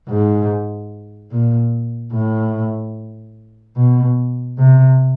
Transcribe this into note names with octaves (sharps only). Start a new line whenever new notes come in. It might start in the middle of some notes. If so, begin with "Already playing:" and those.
G#2
A#2
A2
B2
C3